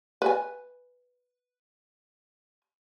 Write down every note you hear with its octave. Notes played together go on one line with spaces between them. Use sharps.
B4 G#5